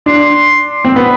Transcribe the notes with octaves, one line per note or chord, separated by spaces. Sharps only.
D4 C6
C4
B3 B5